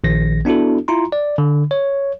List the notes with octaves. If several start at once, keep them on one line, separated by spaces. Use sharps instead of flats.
A#1 D#3 A#6
B3 D4 E4 F#4 A4
E4 F4 A#5 C6
D5
D3
C#5